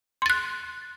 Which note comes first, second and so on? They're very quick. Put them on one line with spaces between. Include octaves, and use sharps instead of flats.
C6 A6 F#6